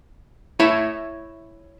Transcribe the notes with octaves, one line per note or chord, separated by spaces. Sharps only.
E4 C#5 E5